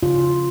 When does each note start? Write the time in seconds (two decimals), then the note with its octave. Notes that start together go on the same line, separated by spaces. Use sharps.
0.03 C#3 F4